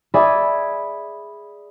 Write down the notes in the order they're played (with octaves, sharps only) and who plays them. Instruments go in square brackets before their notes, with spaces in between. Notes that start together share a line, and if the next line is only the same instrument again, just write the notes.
[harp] G#4 D5 E5 G#5 B5